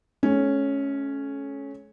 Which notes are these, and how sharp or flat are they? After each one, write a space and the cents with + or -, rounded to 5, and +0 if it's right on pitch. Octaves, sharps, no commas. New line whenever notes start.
A3 -40 C#4 +0